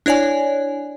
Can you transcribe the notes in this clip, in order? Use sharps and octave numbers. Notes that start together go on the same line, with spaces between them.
D4 E4 C#5 D5 G#5